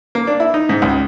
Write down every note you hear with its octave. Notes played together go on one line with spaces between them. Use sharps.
A#3
D4
E4
D#4
G#2
C#2